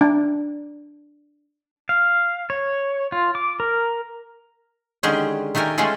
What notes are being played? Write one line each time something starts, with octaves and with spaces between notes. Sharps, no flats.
D4
F5
C#5
F4
D6
A#4
D3 D#3 G#3 C#4 G4 G#4
D#3 A3 G4 A#4 G#5
G#3 A3 C#4 F4 G#4 A4